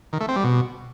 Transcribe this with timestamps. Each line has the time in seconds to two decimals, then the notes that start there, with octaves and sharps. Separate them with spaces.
0.13 D#3
0.21 A3
0.28 C4
0.36 G3
0.44 B2